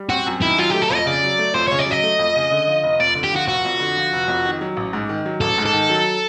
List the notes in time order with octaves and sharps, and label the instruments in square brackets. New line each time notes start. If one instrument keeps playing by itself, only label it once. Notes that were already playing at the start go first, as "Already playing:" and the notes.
Already playing: [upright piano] G3
[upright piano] C4 [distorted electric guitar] F#4
[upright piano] F#2
[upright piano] D#3 [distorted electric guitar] E4
[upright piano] F#3 [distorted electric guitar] F4
[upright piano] A3 [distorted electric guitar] G4
[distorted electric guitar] A4
[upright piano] F2 [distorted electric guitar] D#5
[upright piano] C#3 [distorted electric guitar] D5
[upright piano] F#3
A3
[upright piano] F2 [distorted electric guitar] C5
[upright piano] C#3 [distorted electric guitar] C#5
[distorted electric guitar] D5
[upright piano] F#3 [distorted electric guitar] D#5
[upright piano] A3
F2
C#3
D3
F3
F1
[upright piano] F2 [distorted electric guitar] D5
[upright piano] D3
[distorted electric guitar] G4
[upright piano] F3 [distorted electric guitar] F#4
[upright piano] F1 [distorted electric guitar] F#4
[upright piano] F2
D3
F3
F1
F2
D#3
F#3
A1
G#2
D#3
F#3
[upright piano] A1 [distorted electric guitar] A4
[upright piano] G#2
[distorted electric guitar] A4
[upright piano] D#3
F#3